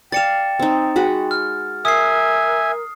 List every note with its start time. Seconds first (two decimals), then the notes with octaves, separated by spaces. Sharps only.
0.12 D5 F5 G5 A6 C#7 E7
0.59 C4 D#4
0.96 G#3 F#4 B5
1.31 F6
1.85 A#4 E5 G#5 D#6 C7